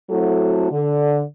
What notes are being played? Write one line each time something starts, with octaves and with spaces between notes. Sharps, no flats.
F#3 A3 C4 E4 F#4 A4
D3